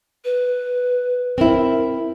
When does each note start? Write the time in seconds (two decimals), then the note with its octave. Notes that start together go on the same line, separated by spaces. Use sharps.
0.25 B4
1.38 C4 E4 A#4